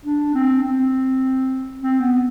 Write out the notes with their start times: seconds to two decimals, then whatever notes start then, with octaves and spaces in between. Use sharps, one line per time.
0.05 D4
0.35 C4
0.63 C4
1.80 C4
2.00 B3